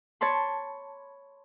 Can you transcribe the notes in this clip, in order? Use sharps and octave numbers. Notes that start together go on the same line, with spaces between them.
C#5 A5 B5 C6